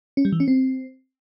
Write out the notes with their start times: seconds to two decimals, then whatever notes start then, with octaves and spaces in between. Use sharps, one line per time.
0.17 C#4
0.25 G3
0.32 E3
0.40 C#4
0.48 C4